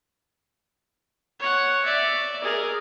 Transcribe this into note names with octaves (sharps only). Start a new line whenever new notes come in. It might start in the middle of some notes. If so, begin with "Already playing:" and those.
C#5 F#5
D5 E5
G#4 A#4